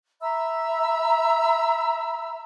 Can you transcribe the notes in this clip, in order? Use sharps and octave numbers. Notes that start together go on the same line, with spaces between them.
E5 A#5 B5 E6